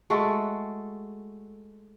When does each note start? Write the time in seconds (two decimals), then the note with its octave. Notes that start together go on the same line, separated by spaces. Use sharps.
0.10 G#3 A3 F#4 A4